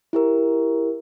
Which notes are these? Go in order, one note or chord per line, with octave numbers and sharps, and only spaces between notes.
E4 G4 A#4